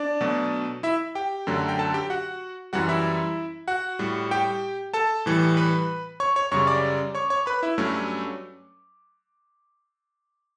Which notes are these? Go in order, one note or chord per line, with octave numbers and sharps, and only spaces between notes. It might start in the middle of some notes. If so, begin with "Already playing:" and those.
Already playing: D4 D5
B2 F#3 A3
E4 E5
G4 G5
F#2 D3 F#3 A3
G5
A4 A5
G4 G5
F#4 F#5
F#2 E3 G3 F#4 F#5
E4 E5
F#4 F#5
A2 G3
G4 G5
A4 A5
A2 E3 G3
B4 B5
C#5 C#6
C#5 C#6
F#2 C#3 G3 C#5 C#6
D5 D6
C#5 C#6
C#5 C#6
B4 B5
E4 E5
G2 F#3 A3 C#4 C#5